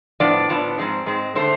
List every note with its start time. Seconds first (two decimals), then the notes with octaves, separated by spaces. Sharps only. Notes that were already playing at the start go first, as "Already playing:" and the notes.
0.20 A2 F3 B3 D4 D5
0.49 A2 F3 B3 D4
0.78 G#2 G#3 C4
1.06 G#2 G#3 C4
1.35 D3 A3 C4 C5